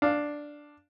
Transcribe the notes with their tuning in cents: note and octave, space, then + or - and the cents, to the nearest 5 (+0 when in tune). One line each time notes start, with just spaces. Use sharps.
D4 +0 F5 +0